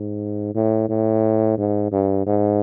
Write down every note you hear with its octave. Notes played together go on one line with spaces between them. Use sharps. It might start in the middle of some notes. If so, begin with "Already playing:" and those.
Already playing: G#2
A2
A2
G#2
G2
G#2